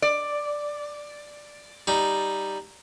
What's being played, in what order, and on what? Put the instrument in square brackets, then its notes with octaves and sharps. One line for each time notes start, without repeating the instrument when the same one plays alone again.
[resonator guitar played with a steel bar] D5
[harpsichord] G3 D#4